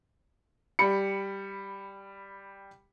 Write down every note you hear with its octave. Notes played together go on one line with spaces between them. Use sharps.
G3 B5 C#7